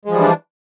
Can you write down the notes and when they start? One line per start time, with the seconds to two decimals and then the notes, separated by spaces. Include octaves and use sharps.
0.05 G#3
0.09 F3
0.13 G3
0.17 E3
0.21 D4